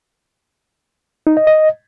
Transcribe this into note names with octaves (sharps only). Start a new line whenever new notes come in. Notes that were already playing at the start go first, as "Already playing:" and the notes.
D#4
D#5
D#5